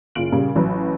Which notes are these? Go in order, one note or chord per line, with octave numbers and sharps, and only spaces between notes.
F#1 F4 D7 F#7
A#2 C#3 G3
A1 F#3 B4